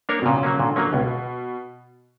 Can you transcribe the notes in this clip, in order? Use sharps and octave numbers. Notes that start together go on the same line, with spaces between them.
A#3 D4 A#4 C#5
B2
A#2 C#3
F#3 A#3 C#4
A#2 D3
F#3 A#3 C#4
C#2 B2